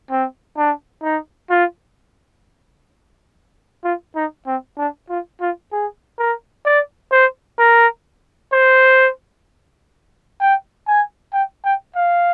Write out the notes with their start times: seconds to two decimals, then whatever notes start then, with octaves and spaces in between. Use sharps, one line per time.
0.10 C4
0.57 D4
1.03 D#4
1.50 F4
3.84 F4
4.16 D#4
4.47 C4
4.78 D4
5.09 F4
5.41 F4
5.72 G#4
6.19 A#4
6.65 D5
7.12 C5
7.59 A#4
8.52 C5
10.40 G5
10.87 G#5
11.33 G5
11.65 G5
11.95 F5